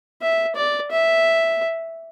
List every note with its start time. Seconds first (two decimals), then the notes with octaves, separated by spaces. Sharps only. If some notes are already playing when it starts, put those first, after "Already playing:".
0.22 E5
0.56 D5
0.91 E5